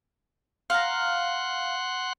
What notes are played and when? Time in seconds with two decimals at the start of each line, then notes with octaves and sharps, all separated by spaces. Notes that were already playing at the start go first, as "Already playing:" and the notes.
0.70 F5 F#5 A#5 C6 F#6